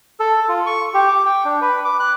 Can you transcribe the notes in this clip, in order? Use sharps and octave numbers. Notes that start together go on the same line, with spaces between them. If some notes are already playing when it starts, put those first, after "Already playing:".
A4
F4
C#6
G4
D6
G5
D4
B4
D6
F#6